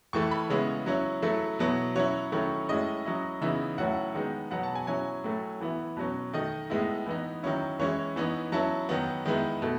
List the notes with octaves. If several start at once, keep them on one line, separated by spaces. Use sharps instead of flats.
A2 E3 A3 C#6
B5
C#3 G#3 B3 E4 C#5
F#3 C#4 E4
F#3 A3 E4
B2 F#3 B3 E4
F#3 C#4 E4 C#5
D#3 F#3 A3 C#4 E4
A2 G#3 C#4 E4 D#5
F#3 C#4 E4
C#3 E3 B3 D#4 E5
A2 F#3 C#4 E4 F#5
D#3 G#3 B3 D#4
B2 F#3 B3 F#5
A5
G#5
F#3 C#4 E4 G#5
A2 F#3 A3
E3 B3 E4
B2 F#3 C#4
D#3 A3 D#4 D#5
A2 G#3 B3 E4
E3 B3 D#4
D#3 F#3 C#4 E4
E3 G#3 C#4 E4 C#5
E3 B3 D#4
F#3 C#4 E4 A5
D#3 F#3 B3
D#3 G#3 B3 E4
B2 A3